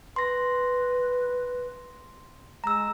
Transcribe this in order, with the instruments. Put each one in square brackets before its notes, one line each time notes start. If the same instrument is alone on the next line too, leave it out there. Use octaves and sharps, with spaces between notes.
[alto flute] B4 [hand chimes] C6 A#6
[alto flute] G#3 [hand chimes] A#5 E6